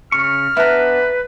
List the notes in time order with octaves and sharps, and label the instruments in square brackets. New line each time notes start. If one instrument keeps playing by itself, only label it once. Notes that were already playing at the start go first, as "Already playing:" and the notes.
[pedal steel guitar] C#3 C#6 [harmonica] F6
[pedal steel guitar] B3 D4 [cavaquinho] E4 A#5 [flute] B4